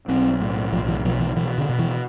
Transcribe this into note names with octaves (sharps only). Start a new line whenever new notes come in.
B1 C4
A2
B1 F3
E3
B2 F3
E3
B2 E3
D3
B2
E3